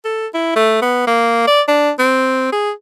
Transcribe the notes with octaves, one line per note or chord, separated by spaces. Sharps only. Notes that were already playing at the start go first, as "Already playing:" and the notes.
A4
E4
A3
B3
A#3
D5
D4
C4
G#4